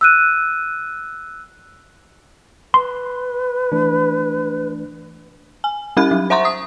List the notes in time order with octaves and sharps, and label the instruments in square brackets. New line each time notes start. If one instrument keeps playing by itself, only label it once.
[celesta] E6 F#6 D#7
[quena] B4 [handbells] C6
[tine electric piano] E3 A3 D4
[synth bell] G#5
G3 C#4 G4 B5 F#6
F#3
C5 E5 F#5 A#5 C6 C#6
D#6